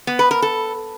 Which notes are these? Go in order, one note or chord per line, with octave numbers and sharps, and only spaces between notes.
B3
B4
A#4
A4